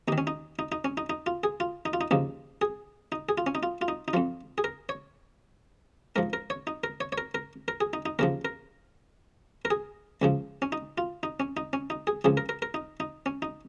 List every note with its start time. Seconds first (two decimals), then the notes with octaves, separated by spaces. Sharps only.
0.08 D#2 D#3 D#4
0.18 C#4
0.27 D#4
0.59 D#4
0.72 D#4
0.85 C#4
0.97 D#4
1.10 D#4
1.26 F4
1.44 G#4
1.60 F4
1.86 D#4
1.93 F4
2.01 D#4
2.11 D#2 C#3 F3 D#4
2.62 G#4
3.12 D#4
3.29 G#4
3.38 F4
3.47 C#4
3.55 D#4
3.63 F4
3.81 F4
3.88 D#4
4.08 D#4
4.13 F2 F3 F4
4.58 G#4
4.64 A#4
4.89 C#5
6.16 G#2 F3 A#4
6.33 A#4
6.50 C#5
6.67 D#4
6.84 A#4
7.01 C#5
7.12 C#5
7.18 A#4
7.35 A#4
7.68 A#4
7.81 G#4
7.93 D#4
8.06 D#4
8.19 D#2 C#3 F3 A#4
8.45 A#4
9.65 A#4
9.70 G#4
10.22 C#2 C#3 F3
10.62 C#4
10.72 D#4
10.98 F4
11.23 D#4
11.40 C#4
11.57 D#4
11.73 C#4
11.90 D#4
12.07 G#4
12.25 C#2 C#3 F3 G#4
12.37 A#4
12.49 A#4
12.62 A#4
12.74 D#4
13.00 D#4
13.26 C#4
13.42 D#4